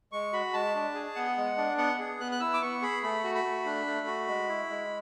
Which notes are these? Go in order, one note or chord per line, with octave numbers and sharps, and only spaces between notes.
G#3 C#6
F#4 B5
G#3 A5
D4
G#4
B3 F#5
G#3
D4
B3 F#5
G#4
B3 F#6
F#6
E4 E6
D6
B3 C#6
G#4 B5
A3 B5
F#4
B5
A3
D4
A3
F#4
G#3
E4
G#3